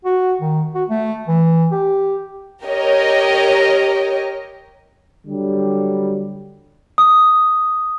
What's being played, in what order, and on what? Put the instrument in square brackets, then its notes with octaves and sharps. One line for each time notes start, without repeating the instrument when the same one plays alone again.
[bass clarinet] F#4
D#3
F#4
A3
E3
G4
[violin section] G4 A#4 C#5 D#5
[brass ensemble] D3 F#3 G3
[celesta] D#6